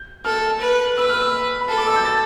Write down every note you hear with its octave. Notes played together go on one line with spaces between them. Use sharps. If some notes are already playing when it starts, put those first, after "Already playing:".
Already playing: G6
A4 F6
B4
B4 E6
F6
E6
B5
A4 A5
D6
E6
G6
A6